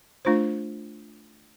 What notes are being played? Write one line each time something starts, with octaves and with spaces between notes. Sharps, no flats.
A3 D4 F4 C5